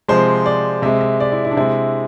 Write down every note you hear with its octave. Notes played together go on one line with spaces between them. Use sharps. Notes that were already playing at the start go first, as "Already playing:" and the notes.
C3 F3 G#3 C5
D5
C3 G#3 E5
E5
D5
E4
E4
D4
C3 G#3 E4